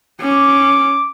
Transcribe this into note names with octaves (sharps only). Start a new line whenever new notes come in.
C#4 D6